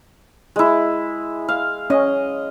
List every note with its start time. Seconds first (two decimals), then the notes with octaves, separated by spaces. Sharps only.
0.56 G#3 E4
1.49 F5
1.90 C#4 D#5